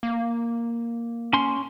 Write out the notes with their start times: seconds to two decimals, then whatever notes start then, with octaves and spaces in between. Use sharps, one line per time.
0.03 A#3
1.33 C#4 C6